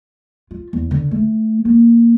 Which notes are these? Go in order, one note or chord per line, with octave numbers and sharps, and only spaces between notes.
F4
E2
D3
A3
A#3